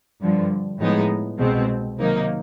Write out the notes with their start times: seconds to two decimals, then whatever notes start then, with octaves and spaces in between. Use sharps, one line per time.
0.21 G2 D3 F3
0.79 A2 F3 G#3 B3 D#4
1.39 C2 B2 G#3 C4
1.98 C3 D#3 F#3 A#3 D#4